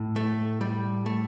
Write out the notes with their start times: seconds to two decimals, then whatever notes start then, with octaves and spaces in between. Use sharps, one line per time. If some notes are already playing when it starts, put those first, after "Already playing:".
Already playing: A2
0.16 A3
0.61 G3
1.06 A3